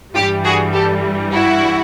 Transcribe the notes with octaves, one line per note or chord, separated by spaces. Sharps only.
G2 E3 G3 F4 G4
F#4 G#4
G4 A4
E4 F#4